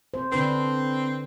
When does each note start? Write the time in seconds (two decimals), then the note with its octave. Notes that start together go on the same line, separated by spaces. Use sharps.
0.14 C4 C5
0.32 D3 C4 D4 B4